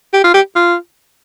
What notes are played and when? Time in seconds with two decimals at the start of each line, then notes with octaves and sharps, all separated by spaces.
0.13 G4
0.24 F4
0.34 G4
0.56 F4